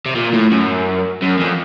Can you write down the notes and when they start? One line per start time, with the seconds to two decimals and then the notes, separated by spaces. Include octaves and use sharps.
0.06 C3
0.16 A#2
0.33 A2
0.51 F#2
1.22 F#2
1.39 F2